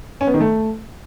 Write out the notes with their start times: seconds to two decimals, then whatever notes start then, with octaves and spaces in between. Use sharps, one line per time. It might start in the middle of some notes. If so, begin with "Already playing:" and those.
0.21 C#4
0.27 B3
0.34 D#3
0.40 A3